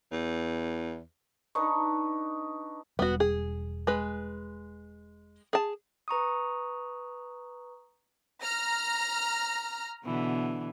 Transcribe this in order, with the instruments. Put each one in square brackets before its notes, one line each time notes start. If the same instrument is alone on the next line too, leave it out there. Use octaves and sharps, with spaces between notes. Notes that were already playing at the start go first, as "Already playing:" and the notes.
[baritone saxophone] E2
[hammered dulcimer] D4 D#4 B4 [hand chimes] C#6
[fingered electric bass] E1 G3 [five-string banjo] B3 F#4
[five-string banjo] G#4
G#3 B4
G#4 A5
[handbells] B4 A#5 C#6 D#6
[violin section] A#5 F6 A#6
[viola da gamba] B2 D3 E3